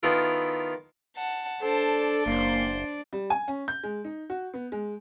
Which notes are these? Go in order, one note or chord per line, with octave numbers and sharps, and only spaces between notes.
D#3 B3 E4 F4 A4 A#4
F#5 A5
D4 A4 C5 D5 A5
F#1 A#3 C5 C6
G3
G#5
C#4
G6
G#3
D#4
F#4
B3
G#3